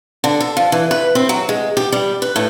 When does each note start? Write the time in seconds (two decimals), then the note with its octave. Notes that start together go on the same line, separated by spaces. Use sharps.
0.24 D3
0.41 A4
0.57 F3
0.72 E3
0.91 B4
1.15 C4
1.29 F#3
1.49 G#3
1.77 G4
1.92 G3
2.22 B4
2.36 A2